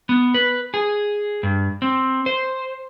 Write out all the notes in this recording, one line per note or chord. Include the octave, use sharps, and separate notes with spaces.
B3
B4
G#4
G2
C4
C5